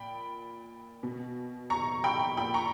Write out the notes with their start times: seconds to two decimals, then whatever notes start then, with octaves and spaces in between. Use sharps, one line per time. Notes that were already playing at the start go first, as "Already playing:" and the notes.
Already playing: A#2 G5 B5
1.03 B2
1.70 A#5 C#6
2.04 G5 B5
2.37 A#2 G5 B5
2.54 A#5 C#6